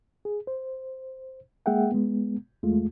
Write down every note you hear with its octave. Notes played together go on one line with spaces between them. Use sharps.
G#4
C5
G#3 A#3 G#4 E5 F#5 G5
G#3 B3
E2 G#3 A3 F4